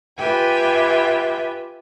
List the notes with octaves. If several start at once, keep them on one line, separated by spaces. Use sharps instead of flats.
F4 G4 B4 E5 G5 G#5